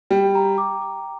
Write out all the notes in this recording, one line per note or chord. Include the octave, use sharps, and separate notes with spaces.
G3 G5
A#5
D6
D6